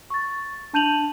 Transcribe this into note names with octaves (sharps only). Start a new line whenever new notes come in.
C#6 A6
D4 A5 G6 D#7 F7 F#7